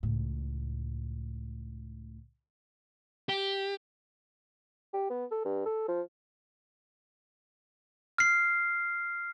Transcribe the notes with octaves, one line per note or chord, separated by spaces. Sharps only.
C#2 A2
G4
G4
B3
A4
G2
A4
F3
F6 C7